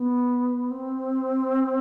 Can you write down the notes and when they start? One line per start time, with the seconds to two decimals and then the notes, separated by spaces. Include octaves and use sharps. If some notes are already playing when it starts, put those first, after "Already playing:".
Already playing: B3
0.71 C4